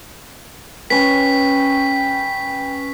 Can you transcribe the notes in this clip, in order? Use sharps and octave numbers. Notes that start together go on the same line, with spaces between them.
C#4 B4 G5 B6